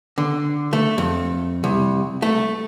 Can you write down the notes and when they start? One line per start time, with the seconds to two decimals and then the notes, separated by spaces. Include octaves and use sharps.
0.18 D3
0.73 A3
0.98 F2
1.64 C2
2.22 A3